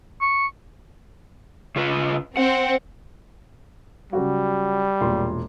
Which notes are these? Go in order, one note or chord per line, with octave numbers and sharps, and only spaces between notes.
C#6
C#3 F4 B4
C4 F#5
C#3 F#3 G3 F#4
E1 A#2 C6